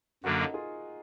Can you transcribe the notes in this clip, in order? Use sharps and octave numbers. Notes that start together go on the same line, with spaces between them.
F#2 D3 F#3 A#3 D4 F#4 A#4
D#4 F#4
F4 G#4